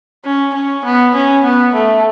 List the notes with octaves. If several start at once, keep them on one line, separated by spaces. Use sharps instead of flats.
C#4
C#4
B3
C#4
B3
A3